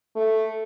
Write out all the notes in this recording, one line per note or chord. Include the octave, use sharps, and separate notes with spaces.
A3